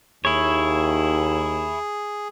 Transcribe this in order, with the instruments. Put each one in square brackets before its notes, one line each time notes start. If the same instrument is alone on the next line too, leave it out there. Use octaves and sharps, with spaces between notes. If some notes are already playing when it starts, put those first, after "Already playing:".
[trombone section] D#2 [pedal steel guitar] E4 C#5 [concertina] G#4